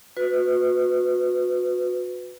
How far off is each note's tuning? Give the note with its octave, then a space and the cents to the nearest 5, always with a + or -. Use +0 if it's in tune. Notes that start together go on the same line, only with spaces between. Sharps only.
F#4 -30 B4 +15